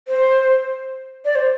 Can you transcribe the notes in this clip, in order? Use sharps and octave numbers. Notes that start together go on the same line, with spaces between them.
C5
D5
C5